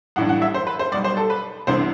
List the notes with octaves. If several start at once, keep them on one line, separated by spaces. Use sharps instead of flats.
B1 A2 E3 G3 D4 F#5
F#5
E5
C5
B4
C5
B1 B2 G3 D5
C5
A4
B4
C2 C3 E3 B3 D4 C5